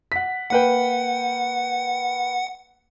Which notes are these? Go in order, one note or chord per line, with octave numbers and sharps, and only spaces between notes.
F#5 B6
A#3 B4 F#5 G5